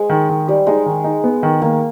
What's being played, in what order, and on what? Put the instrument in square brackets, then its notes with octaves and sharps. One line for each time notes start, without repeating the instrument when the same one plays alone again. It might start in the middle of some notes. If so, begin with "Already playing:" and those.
Already playing: [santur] G#3
[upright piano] D#3
D#3
[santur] G3 [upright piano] G4
[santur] G#3 [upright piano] D#4
[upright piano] D#3
D#4
B3
D#3
[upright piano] D#3 [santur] A#3